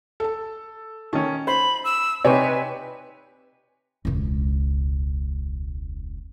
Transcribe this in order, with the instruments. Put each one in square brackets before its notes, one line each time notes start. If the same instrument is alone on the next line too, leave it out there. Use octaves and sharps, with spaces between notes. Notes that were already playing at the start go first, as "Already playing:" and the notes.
[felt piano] A4 A5
[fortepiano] D#3 C#4 [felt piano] A5
[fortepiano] C5 [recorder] B5
[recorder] E6
[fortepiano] C3 D#4 [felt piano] G4 C#5 [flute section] B4 [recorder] G#5
[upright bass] E1 C#2